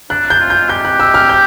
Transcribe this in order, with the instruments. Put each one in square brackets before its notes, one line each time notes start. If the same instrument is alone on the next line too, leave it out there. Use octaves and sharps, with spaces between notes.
[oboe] D4 [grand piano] F#6
[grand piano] G6
[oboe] F4
[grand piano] G6
[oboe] G4 [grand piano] G6
[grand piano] F#6
E6
F6
G6